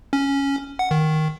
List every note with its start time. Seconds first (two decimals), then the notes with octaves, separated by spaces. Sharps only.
0.13 C#4
0.79 F#5
0.91 D#3